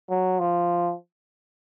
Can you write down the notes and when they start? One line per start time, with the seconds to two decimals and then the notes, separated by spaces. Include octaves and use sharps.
0.09 F#3
0.39 F3